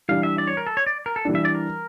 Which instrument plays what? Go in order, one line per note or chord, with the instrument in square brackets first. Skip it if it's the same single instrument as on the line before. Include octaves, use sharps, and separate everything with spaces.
[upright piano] E3 G3 D4 [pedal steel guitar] F5
[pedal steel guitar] E5
D5
C#5
A#4
A4
C#5
D5
A#4
A4
[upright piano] E3 G3 D4
[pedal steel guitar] E5
D5
A#4